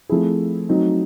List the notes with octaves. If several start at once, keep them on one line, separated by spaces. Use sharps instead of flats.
F3 A3 C4 E4 G#4
F#3 A3 C4 D#4